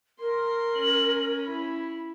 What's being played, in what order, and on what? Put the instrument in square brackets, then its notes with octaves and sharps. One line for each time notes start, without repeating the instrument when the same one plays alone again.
[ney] A#4 [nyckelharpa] C6
[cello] C#4 [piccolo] F#7
[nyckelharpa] E4 [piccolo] B5